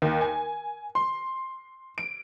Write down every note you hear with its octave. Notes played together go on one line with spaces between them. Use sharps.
D#2
G#5
C6
D7